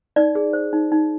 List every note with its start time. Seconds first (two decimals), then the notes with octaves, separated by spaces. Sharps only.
0.16 D#4 D5
0.35 G#4
0.53 C5
0.73 D#4
0.92 D#4